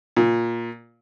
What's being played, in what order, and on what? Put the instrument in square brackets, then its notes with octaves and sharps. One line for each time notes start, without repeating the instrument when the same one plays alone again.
[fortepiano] A#2